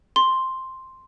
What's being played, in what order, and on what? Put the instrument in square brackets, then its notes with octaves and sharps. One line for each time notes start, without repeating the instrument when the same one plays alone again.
[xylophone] C6